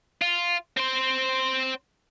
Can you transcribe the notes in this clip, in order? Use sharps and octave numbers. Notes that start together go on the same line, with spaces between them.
F4
C4 C5